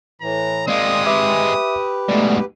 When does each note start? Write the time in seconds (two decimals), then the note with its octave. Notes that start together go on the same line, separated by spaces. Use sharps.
0.21 A2 E3 A#5
0.68 G#3 A#3 C4 D5 D#5 D#6
1.06 G4 B4 E5 D6
2.08 G#2 B2 A3 D5